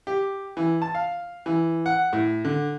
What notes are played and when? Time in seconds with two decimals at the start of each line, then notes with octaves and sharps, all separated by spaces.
0.07 G4
0.57 E3
0.82 A5
0.95 F5
1.46 E3
1.86 F#5
2.13 A2
2.45 D3